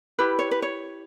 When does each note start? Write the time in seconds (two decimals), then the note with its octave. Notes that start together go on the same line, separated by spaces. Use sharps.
0.19 E4 G4 B4
0.39 C#5
0.51 B4
0.62 C#5